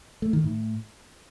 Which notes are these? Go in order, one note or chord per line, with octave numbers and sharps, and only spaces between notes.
A3
D#3
A2